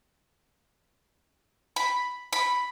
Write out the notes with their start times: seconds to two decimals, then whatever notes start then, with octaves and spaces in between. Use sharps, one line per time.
1.76 B5
2.33 B5